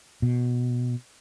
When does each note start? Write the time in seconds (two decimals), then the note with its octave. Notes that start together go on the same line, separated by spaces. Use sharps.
0.22 B2